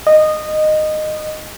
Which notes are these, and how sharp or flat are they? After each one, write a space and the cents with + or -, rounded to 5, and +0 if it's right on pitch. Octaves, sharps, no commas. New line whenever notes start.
D#5 -15